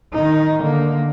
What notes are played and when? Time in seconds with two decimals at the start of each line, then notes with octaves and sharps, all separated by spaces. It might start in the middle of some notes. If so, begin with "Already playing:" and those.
0.13 D#3 D#4
0.62 D3 A#3